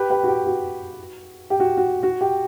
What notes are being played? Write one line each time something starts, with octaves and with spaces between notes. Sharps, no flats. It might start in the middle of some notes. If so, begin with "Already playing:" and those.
Already playing: G4 B4
G4 B4
F#4
G4
F#4
G4
F#4
F#4
F#4
G4